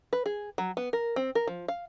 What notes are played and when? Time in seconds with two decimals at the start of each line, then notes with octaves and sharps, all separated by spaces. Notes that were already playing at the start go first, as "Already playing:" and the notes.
0.13 B4
0.26 G#4
0.58 F#3
0.77 B3
0.93 A#4
1.16 C4
1.35 A#4
1.47 F3
1.68 F5